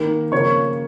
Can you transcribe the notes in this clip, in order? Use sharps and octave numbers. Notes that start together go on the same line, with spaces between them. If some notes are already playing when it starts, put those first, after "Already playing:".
Already playing: D#3 A#3
C#3 F3 A#3 C#5 C#6